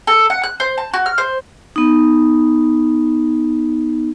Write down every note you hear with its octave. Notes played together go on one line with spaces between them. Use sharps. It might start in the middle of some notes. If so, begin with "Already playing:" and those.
A4
F#5
F#6
C5
A5
F#4
F6
C5
B3 D#4